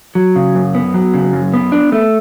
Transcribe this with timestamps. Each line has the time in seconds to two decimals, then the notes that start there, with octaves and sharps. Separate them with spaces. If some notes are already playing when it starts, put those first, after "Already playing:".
0.15 F#3
0.36 C#3
0.55 F#2
0.75 B3
0.94 F#3
1.14 C#3
1.33 F#2
1.54 B3
1.72 D4
1.92 A3